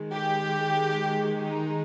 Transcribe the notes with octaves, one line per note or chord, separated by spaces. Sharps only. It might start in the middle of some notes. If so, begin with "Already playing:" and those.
Already playing: D#3 G#3
G4
D#4